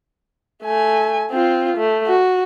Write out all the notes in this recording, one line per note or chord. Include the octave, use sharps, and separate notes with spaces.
A3 G#5
C4 F4
A3
F#4